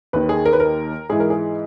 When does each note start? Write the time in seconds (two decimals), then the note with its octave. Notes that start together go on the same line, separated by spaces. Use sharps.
0.13 D#2 D#3 B4
0.29 G#4
0.46 A#4
0.53 B4
0.60 A#4
1.10 G#2 E3 G#4
1.20 A#4
1.30 G#4